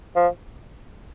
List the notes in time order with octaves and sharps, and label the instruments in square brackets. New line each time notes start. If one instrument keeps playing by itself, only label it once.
[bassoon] F3